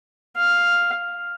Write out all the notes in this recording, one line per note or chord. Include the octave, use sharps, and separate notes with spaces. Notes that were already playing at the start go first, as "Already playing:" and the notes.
F5